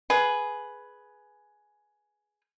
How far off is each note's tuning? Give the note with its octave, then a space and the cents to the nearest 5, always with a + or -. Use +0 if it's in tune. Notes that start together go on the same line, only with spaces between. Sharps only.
G#4 +10 B4 +0